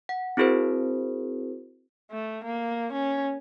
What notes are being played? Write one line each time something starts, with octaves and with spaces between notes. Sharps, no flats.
F#5
C4 E4 F#4 G#4 A#4 C5
A3
A#3
C#4